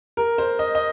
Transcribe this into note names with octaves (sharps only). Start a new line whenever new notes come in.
A#4
C5
D#5
D#5